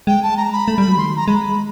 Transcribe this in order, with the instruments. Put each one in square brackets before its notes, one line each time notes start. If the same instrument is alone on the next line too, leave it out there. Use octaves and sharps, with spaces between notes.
[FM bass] G#3 [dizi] G5
[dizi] A5
A#5
B5
[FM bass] A3
G3
F#3
[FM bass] D#3 [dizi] C6
[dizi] A#5
[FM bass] G#3 [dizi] B5